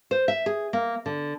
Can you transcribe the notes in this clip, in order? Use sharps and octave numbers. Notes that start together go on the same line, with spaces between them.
C5
E5
G#4
A#3
D3